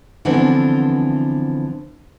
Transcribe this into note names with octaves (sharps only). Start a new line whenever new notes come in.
D3 E3 F3 B3 C4 D4